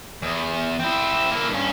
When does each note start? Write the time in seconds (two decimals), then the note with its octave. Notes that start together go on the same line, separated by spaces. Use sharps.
0.22 E2
0.80 C4 E4
1.31 A#3 E4
1.49 G2 C#4